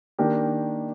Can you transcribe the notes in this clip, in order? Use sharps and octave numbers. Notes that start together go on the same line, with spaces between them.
D#3 A#3 D4 G4 A#4